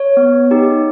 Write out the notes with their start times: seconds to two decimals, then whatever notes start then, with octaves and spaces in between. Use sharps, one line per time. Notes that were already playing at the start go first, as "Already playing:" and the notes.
Already playing: C#5
0.17 B3
0.51 D#4 G4